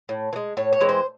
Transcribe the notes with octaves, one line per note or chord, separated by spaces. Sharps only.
A2
E3
G#3
A2 C#5
C#5
E3 G#3 C4
C5